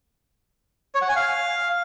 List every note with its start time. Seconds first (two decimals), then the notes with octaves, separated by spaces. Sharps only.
0.95 C#5
1.02 F#5
1.09 G#5
1.16 F5